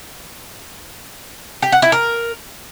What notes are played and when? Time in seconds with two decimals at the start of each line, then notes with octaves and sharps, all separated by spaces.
1.62 G4
1.72 F#5
1.82 E4
1.92 A#4